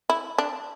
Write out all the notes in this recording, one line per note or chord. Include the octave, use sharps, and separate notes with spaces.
E4
D4